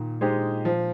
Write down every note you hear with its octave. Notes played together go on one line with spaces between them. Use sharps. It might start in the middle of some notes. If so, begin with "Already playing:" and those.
Already playing: A#2 D#3
G#3 D#4 G4 C5
F3